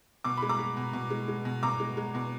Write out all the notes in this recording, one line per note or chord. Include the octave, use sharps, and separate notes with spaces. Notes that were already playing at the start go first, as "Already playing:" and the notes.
B2 D6
G#3 B5
A#5 D6
G#3
B2
B2
G#3
G#3
B2
B2 A#5 D6
G#3
G#3
B2